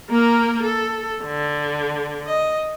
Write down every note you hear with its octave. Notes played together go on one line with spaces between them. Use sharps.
A#3 A#4
A4
D3
D#5